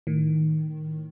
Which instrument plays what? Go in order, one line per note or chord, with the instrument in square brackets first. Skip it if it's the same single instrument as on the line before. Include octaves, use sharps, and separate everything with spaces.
[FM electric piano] A2 D#3